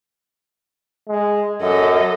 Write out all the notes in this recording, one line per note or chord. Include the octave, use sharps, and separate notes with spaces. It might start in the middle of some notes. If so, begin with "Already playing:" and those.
G#3
F#2 A4 D#5